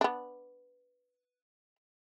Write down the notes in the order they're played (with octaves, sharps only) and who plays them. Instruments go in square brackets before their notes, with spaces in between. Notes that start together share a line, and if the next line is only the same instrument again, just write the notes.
[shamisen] B3 D4